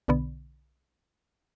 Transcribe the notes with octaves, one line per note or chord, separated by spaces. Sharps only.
B1 B2 D3 B3